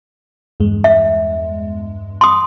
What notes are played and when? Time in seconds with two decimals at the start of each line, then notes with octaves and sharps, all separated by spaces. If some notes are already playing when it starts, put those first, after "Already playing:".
0.60 E2 G2 G#3
0.84 E5
2.21 C6 D#6